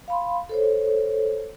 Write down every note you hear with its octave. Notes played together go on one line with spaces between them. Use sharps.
F5 B5 C6
A4 C5 C#5